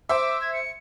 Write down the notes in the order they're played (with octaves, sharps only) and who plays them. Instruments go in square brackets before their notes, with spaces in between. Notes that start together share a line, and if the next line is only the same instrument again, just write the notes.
[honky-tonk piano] C5 E5 [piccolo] D6
[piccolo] G#6
C#7